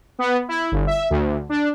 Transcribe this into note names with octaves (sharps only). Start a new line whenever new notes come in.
B3
E4
G1
E5
D2
D4